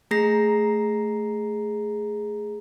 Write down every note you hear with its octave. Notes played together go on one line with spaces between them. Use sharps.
A3 G#4 A#5 A#6 C7